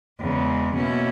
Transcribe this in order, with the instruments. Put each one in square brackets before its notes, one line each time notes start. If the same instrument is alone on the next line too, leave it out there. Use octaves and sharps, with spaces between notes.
[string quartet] E2 C#3 G#3
B2 A#3 C#4 E4